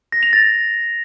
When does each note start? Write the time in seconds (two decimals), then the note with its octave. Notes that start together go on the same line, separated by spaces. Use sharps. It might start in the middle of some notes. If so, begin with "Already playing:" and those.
0.12 A#6
0.23 F7
0.33 A6